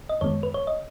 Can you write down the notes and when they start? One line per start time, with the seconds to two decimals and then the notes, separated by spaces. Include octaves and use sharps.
0.09 D#5
0.21 F#2 D#3 G#3 B3 C#5
0.43 B4
0.54 C#5
0.67 D#5